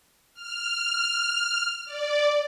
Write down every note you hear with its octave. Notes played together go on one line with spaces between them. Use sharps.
F6
D5